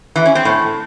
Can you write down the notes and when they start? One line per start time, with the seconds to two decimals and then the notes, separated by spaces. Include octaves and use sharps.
0.16 E3
0.25 C#4
0.35 C4
0.45 A2